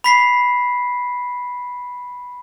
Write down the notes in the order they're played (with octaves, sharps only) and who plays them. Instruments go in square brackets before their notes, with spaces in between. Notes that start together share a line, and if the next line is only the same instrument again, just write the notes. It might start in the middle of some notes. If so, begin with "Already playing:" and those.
[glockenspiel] B5 B6 C7